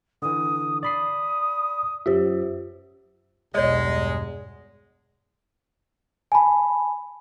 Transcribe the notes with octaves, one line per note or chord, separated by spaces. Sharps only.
D3 E3 D#6
D5 B5 D#6 C7
F#2 F4 G4 C5 E5
B1 E2 G2 G#3 C#5 D#5
G#5 A5 B5